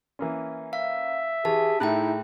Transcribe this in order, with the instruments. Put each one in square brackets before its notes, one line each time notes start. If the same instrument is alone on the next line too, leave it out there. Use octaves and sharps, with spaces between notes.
[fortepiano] E3 A#3 C#4
[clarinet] E5 [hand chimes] F5
[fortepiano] E3 [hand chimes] G4 A5 [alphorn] G#4
[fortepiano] A2 F#6 [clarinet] D#4 [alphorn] E4 [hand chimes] G#4 E5 G5